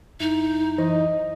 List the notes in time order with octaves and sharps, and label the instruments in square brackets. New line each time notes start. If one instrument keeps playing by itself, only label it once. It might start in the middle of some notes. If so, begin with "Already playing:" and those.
[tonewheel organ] F#2 E4 [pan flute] D#4
[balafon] E3 [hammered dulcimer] D#5